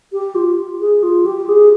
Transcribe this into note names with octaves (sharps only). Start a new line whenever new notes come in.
G4
F4
G#4
F4
G4
G#4